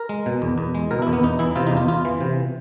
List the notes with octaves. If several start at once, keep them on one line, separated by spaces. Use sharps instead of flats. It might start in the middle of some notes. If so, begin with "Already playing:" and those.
Already playing: A#4
G#3
B2
E2
E2
G#3
B2 A#4
E4
E2
B3
E2 D#4
E3 E4
C3 F4
D#4
E2
F4
E2 F4
E3
C3